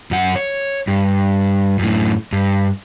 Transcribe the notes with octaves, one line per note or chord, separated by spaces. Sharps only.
F#2 F#5
C#5
G2
F#2 A2
G2